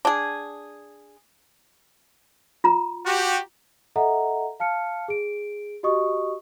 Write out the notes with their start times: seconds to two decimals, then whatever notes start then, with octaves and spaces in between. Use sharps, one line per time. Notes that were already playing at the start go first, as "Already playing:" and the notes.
0.05 D4 G#4
2.64 F4 A#5
3.05 F#4 G4
3.96 A4 D#5 E5 F#5 A#5
4.60 F5 A5 F6 C#7
5.08 G#4 D7
5.83 F#4 G4 D#5 C#6 D#6